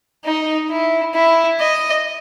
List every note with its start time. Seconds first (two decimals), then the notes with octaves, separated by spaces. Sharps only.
0.25 D#4
0.70 E4
1.14 E4
1.60 D#5